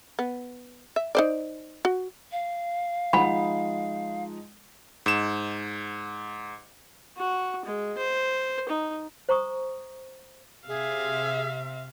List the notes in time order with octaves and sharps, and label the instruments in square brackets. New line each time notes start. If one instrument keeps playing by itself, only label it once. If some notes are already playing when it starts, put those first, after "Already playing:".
[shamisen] B3
E5
D#4 C5 D5
F#4
[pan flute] F5
[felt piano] F3 G#3 D#4 [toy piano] F#5 B5
[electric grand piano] G#2 E7
[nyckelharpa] F#4
G#3
C5
D#4
[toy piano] C5 A#5 C#6 D#6
[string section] C3 [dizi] G#4 [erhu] E5 [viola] F5